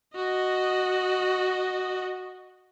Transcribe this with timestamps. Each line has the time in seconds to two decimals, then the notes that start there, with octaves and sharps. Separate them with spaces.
0.16 F#4 D#5